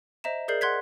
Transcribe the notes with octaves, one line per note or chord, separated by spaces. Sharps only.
C5 D#5 E5 A#5 E7
G#4 A#4 D5 G6 C7 F#7
F#5 C6 F#6 G#6 B6